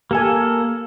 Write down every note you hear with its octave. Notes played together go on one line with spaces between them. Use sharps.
A#3 G4 A4 G#5